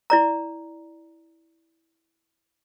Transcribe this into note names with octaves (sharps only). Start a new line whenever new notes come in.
E4 D5 A#5